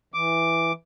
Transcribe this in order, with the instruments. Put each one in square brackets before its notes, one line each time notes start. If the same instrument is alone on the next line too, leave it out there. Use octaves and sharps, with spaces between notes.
[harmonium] E3 [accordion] D6